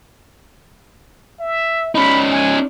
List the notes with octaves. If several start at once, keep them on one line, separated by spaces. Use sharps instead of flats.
E5
C#4 D#4 B5
G#5